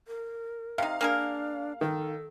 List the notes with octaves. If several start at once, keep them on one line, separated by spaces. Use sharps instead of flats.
A#4
C3 D#4 F5
A#3 D4 G#4 A#4
D#3 A4